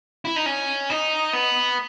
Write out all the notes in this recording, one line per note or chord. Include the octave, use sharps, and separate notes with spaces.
E4
D#4
C#4
D#4
B3